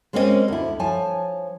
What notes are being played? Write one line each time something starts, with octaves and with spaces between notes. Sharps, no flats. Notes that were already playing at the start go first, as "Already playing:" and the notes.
G#3 A#3 C4 C#4 A4 D#5
D2 E4
F3 C#5 G#5 A5